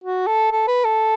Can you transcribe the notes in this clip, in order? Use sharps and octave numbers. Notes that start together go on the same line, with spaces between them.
F#4
A4
A4
B4
A4